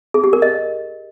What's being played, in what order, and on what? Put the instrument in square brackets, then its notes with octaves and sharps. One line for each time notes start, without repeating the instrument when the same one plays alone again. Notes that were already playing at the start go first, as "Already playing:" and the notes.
[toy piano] G#4
G4
A#4
D#5